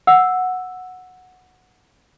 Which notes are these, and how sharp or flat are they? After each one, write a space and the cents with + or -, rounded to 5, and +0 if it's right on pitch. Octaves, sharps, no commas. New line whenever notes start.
F#5 -10 E6 +0